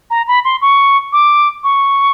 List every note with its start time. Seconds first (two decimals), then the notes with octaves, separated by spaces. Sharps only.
0.10 A#5
0.28 B5
0.45 C6
0.62 C#6
1.13 D6
1.64 C#6